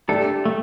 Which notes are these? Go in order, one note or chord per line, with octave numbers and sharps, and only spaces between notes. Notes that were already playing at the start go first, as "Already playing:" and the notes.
A3 D4 G4 A4
A3